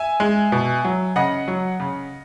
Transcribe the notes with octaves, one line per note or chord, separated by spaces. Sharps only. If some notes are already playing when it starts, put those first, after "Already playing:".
Already playing: E5 G#5
G#3
B2
F#3
C#3 D#5 F#5
F#3
C#3